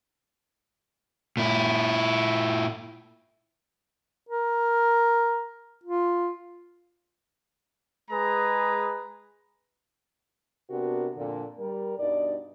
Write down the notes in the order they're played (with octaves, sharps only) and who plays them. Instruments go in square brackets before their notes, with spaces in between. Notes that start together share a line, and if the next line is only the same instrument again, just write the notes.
[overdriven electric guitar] A#2 E4
[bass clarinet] A#4
F4
[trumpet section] G#3 G#4 B4 A#5
[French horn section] C3 B3 D4 F#4 A#4
F2 A#2 D3
G3 A#4
G2 B2 D#4 D5